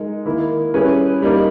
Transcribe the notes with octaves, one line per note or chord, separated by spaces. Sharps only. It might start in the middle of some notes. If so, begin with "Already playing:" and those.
Already playing: G#3 D#4 A#4
D#3 A#3 E4
G3 C#4 E4 G#4 B4
G3 A#3 D#4 A#4